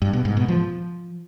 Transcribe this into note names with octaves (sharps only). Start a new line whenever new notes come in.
G2
B2
G#2
B2
F3